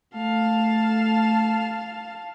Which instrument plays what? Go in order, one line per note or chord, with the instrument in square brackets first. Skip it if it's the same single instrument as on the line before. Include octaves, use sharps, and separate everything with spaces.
[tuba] A3 [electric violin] F5 A5